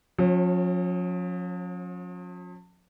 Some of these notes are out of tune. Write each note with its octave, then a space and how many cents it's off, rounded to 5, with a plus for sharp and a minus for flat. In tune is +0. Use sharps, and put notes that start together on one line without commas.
F3 +45 C#4 -20